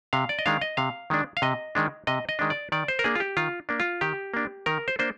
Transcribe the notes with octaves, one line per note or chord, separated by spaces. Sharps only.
C3 F5
D5
D#5
D#3 G#3 D4 F5
D#5
C3 F5
D#3 G#3 D4
F5
C3 D#5
D#3 G#3 D4
C3 D#5
D#5
D#3 G#3 D4
D5
D#3 D5
C5
A#4
A#3 D4 G#4
F4
G4
D#3 F4
A#3 D4
F4
D#3 G4
A#3 D4
D#3 A#4
C5
A#3 D4 C5